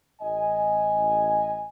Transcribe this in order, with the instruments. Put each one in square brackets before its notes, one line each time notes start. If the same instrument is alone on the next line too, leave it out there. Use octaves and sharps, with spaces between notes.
[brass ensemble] A1 D#5 G#5